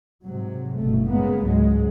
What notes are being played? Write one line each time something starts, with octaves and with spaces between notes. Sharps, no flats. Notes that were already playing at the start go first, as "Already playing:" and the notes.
G#2 C3 F#3
F#1 G2 B2 A3
C#3 G#3 A#3 B3
C#2 G#2 F#3 G#3